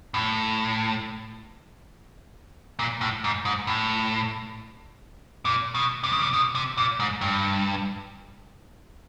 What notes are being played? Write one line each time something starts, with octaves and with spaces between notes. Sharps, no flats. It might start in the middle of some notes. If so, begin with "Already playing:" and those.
A2
A#2
A2
G#2
G#2
A2
A#2
B2
C3
C#3
C3
B2
C3
A#2
G#2
G2